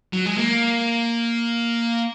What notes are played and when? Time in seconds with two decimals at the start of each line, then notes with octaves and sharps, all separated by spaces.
0.13 F#3
0.26 G#3
0.37 A#3